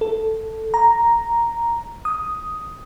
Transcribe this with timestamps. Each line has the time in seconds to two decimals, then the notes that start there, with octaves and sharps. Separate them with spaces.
0.01 A4
0.74 A#5
2.05 D#6